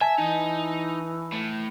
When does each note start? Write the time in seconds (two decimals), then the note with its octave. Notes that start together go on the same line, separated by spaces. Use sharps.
0.01 E5 G#5 A5
0.18 E3 D#4
1.32 A2